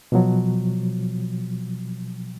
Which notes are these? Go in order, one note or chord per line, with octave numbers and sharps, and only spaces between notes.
B2 F3 F#3